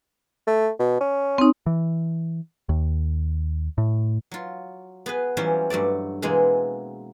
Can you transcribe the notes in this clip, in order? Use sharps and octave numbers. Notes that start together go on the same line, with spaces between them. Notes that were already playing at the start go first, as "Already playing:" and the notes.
A3
B2
C#4
C4 D#4
E3
D#2
A2
F#3 F4
B3 G#4 B4
E3 F#3 G3 C#4 F4 C5
G2 F#3 A3 D5
B2 E3 G#3 A#3 C4 G#4